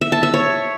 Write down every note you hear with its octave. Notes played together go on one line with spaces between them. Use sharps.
E5
A5
E5
C#5